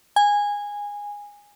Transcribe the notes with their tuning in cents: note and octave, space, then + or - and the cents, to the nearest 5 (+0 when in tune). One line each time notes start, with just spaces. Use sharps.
G#5 -15